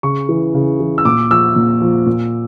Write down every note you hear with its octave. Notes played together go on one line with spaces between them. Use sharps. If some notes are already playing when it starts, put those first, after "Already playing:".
C#3 C#6
E3
C#3
E3
E6
A#2 D6
F3 E6
A#2
F3
A#2